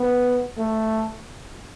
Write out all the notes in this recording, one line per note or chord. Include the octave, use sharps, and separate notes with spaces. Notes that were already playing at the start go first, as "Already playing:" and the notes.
Already playing: B3
A3